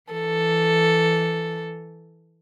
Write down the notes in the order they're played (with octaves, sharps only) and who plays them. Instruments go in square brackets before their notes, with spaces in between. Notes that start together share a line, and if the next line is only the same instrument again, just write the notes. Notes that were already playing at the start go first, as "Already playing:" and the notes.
[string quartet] E3 A4